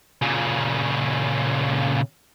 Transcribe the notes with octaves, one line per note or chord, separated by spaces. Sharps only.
A#2 C#3